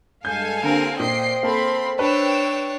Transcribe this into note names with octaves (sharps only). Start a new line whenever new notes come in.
G2 G#3 A4 F5 G#5 G6
D3 G3 A#3 C4 A#4
A#2 C5 D#5 G5 C7
A#3 C4 A4 B5 C6
D4 B4 C#5 G5 E6